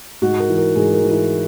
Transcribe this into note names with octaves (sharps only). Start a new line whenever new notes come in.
G#2 F#4
A#4
E3
A#4
G#2 G#4
A#4
E3
E4